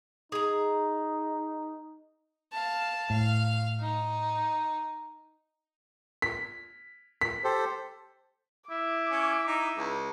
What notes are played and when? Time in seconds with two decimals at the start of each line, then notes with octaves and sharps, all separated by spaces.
0.32 D#4 G#4 A#5
2.52 F5 A5
3.10 A2 F5
3.80 D#4
6.22 B6
7.21 B6
7.44 G4 A4 C5
8.70 E4 D6
9.12 C#4
9.47 D#4
9.78 C#2